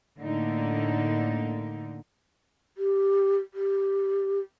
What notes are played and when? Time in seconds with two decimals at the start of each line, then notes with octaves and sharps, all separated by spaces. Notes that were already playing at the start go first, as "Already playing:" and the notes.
0.20 A2 D3 A#3 D#4
2.78 G4
3.54 G4